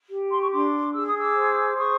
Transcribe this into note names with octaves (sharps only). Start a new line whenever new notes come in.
G4
C6
C#6
D4 C6 D6
G#4 E6
D#6
D6 E6
C5
G#4 C#6 D#6